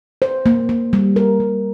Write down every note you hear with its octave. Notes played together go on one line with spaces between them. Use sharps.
C5
A#3
A#3
G3
A#4
G3